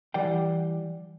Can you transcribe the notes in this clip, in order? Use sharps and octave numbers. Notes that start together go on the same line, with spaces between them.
E3 G3 D5 F#5 G5